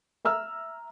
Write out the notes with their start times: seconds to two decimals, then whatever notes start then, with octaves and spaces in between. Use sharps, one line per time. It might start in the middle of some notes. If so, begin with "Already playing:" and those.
0.25 E5 A#5 E6 F6